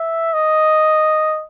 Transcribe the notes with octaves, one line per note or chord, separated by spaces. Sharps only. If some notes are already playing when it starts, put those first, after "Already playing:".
Already playing: E5
D#5